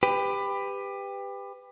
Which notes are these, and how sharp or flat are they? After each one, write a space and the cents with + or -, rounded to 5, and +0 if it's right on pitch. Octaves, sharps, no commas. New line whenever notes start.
G4 +20 B4 +15